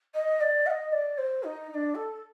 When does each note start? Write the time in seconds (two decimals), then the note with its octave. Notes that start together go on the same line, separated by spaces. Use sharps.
0.14 D#5
0.40 D5
0.66 F#5
0.70 D#5
0.92 D5
1.17 C5
1.43 D#4
1.69 D#4
1.74 D4
1.95 A4